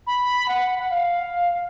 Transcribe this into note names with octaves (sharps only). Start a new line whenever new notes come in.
B5
F#5
F#5
F5